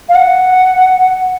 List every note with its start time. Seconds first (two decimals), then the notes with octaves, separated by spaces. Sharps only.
0.09 F5
0.15 F#5